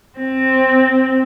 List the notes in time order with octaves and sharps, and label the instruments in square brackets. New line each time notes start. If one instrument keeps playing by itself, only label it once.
[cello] C4